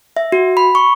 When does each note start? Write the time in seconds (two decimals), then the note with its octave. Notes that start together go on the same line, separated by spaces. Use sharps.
0.17 E5
0.32 F#4
0.57 B5
0.75 C#6